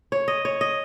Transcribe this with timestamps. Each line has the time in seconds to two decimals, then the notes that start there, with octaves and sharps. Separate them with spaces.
0.12 C#5
0.28 D#5
0.45 C#5
0.61 D#5